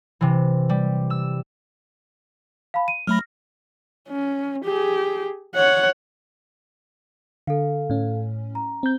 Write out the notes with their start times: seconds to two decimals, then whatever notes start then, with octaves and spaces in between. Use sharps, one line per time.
0.21 C3 E3
0.69 G3
1.10 E6
2.74 F5 A5 B5
2.88 D#7
3.07 F#3 A3 B5 F6 A#6
4.09 C#4
4.65 G4 G#4
5.55 C#5 F#5
7.47 D3 A4 F5
7.90 A2 C#4
8.55 A#5
8.83 C4 G6